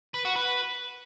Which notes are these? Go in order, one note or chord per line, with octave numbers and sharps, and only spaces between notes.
B4
F#4
B4